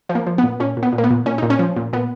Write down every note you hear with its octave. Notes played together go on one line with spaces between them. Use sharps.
F3
A#3
F3
B3
A#2
A#2 C#4
A#2
B3
A#2
A#3
B3
A#2
A#2 C#4
A#2 D#4
C#4
F3
A#2
A#2 B3